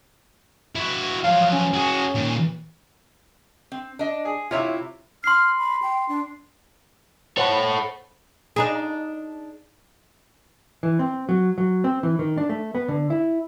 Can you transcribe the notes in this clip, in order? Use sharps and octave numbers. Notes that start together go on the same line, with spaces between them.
E4 F#4
F3 F#3 F5
C#4
F#4 G#4
A#2 D#3
C4
D4 D#5
G#4
C3 E4 F4 C#5 E5
C6 F6 C7
B5
G5
D4
A4 C5 C#5 F#5 B5
D4 D#4 G#4
E3
C4
F#3
F#3
C4
E3
D#3
D4
A3
B3
D3
E4